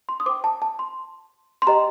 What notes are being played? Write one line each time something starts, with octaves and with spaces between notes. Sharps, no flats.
C6
D#6
C5 G5 D6
A5
A5
C6
C6
G4 C5 D#5 G5 A#5